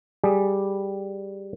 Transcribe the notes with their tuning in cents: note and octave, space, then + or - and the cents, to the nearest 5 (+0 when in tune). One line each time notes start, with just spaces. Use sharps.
G3 +0 G#4 +0